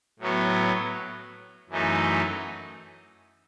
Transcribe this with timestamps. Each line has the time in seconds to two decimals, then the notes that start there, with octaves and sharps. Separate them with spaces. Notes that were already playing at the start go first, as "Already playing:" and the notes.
0.19 A2 F#3 B3
1.69 F#2 E3 A3 D#4